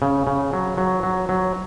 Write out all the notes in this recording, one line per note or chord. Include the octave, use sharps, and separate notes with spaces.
C#3
C#3
F#3
F#3
F#3
F#3